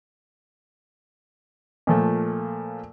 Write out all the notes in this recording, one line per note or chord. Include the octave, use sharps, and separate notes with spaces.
A#2 F3 A3